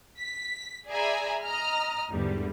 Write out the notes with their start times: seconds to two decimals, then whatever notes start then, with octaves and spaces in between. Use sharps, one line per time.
0.19 B6
0.89 G#4 D5 E5 G#5 A#5 B5
1.45 D#5 A#5 F6
2.10 E2 G#2 D3 G3